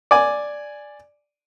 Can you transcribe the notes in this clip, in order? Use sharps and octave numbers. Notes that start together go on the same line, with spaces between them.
D5 G#5